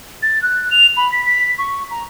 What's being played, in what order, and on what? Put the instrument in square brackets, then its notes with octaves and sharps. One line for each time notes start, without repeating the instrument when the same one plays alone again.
[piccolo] A6
F#6
F7
B5
B6
B6
C#6
A#5